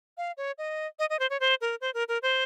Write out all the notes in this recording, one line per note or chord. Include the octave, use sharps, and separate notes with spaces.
F5
C#5
D#5
D#5
D#5
C5
C#5
C5
A#4
C5
A#4
A#4
C5